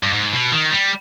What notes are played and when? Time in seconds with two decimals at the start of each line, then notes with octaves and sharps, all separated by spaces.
0.03 G2
0.13 G#2
0.33 B2
0.52 D#3
0.70 G3